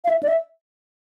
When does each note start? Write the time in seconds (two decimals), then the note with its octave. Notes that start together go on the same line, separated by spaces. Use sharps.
0.04 F5
0.09 E5
0.23 D5
0.28 E5